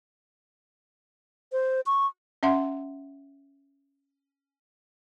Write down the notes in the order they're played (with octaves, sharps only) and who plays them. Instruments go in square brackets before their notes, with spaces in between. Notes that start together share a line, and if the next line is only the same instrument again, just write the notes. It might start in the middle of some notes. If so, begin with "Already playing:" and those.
[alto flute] C5
C#6
[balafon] C#4 E5 F#5 C6